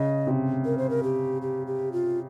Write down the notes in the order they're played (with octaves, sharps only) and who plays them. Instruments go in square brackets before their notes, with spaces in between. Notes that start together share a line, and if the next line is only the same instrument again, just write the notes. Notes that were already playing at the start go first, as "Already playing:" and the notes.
Already playing: [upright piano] C#3 [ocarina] D#5
[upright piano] C3
[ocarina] A#4
C5
A#4
G4
G4
G4
F4